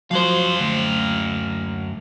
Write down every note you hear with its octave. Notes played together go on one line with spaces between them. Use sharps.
F#2 F3 F#3 C5 F5
D2